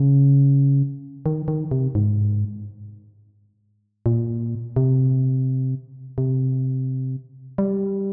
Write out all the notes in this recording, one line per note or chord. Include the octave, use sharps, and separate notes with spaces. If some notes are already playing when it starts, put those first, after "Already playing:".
Already playing: C#3
D#3
D#3
C3
G#2
A#2
C3
C3
G3